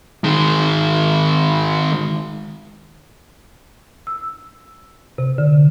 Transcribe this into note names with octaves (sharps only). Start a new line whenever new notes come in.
D#3 G#3
E6
C3
D3